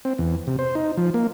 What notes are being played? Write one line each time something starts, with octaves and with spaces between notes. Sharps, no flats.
C4
E2
C3
C5
D#4
F3
A#3